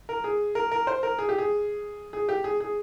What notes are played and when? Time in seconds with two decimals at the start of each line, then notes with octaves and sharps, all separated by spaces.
0.09 A#4
0.24 G#4
0.55 A#4
0.72 A#4
0.87 C5
1.03 A#4
1.19 G#4
1.29 G4
1.38 G#4
2.13 G#4
2.29 G4
2.44 G#4
2.60 G#4